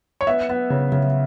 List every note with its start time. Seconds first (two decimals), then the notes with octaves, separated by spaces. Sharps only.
0.21 C#5
0.27 B3 E5
0.49 B3
0.70 C#3
0.92 C#3